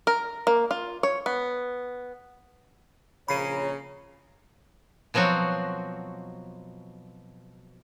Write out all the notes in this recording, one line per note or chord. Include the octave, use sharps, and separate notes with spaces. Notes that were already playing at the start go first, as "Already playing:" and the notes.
A#4
A#3
F4
C#5
B3
A#1 C#3 C#5 A#5 B5 C7 D#7
B2 F3 F#3 C4 F#4